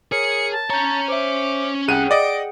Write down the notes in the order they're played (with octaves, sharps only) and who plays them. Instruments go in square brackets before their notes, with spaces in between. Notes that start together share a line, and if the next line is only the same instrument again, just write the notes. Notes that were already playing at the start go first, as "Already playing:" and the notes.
[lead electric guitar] G#4 [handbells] A#4 C#5 [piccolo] C#7
[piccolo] A5
[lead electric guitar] C#4 C#5 [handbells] A#5 G6
[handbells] C5 E5 [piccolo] D6
[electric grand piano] C2 D#7 [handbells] G#4 F#5 G5 [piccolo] F#6
[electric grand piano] D5 D#5 [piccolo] D7